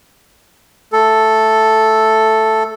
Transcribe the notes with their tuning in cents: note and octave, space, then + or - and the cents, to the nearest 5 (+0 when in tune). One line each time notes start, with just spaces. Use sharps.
A3 +0 A4 +0